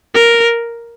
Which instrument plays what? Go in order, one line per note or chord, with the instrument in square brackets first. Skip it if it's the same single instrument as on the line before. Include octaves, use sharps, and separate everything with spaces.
[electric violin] A#4